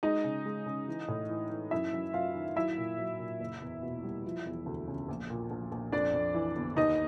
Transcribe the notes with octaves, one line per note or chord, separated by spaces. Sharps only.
G#3 D#4 D#5
C#3
G#3
C#3
E3
A2
E3
E3
F#2 E4 E5
F#2
F#2 F4 F5
D#3
F#3 E4 E5
A#2
F#3
A#2
F#1
E2
B2
G3
F3
E1
D2
C#3
A#1
A#2
A#1
A#1
F2 D4 D5
F2
E3
G1
D#2 D#4 D#5